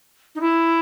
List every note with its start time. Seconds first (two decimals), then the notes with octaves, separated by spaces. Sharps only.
0.35 D#4
0.40 E4